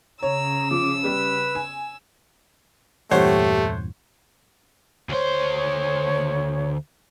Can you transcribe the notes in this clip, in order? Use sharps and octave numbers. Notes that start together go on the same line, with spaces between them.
C#3 C#5 A#5 E6
F3 D6
G3 G4 B4
G#5
E2 G2 A#2 A3 G4 C5 C#5 F#5
D2 C5 C#5